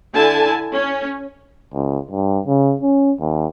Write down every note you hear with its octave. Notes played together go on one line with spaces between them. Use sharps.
D3 E4 G#5 A5
C#4
C#2
G2
C#3
C#4
D#2